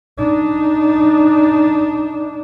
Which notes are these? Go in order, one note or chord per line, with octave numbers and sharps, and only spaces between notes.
D4 D#4